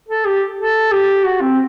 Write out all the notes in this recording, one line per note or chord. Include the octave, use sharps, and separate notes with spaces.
A4
G4
A4
G4
F#4
C4